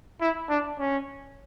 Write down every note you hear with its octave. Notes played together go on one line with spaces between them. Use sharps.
E4
D4
C#4